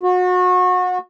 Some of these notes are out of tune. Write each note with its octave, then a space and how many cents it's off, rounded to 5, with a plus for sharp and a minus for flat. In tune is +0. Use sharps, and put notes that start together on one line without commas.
F#4 -30